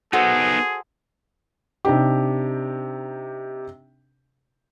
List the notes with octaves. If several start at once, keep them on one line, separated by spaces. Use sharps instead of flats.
B3 D#4 F#4 G#4 A4 C5
C3 D4 D#4 G4